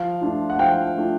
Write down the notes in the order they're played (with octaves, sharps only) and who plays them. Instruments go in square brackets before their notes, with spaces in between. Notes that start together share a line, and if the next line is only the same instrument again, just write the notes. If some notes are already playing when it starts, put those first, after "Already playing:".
Already playing: [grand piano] F3 F5
A3 D4 F4
F#5
F3 F5 G5
A3 D4 F4